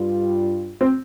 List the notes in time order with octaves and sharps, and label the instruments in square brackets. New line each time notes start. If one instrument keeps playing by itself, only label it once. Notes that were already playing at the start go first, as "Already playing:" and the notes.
Already playing: [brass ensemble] G2 G3 F4
[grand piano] C4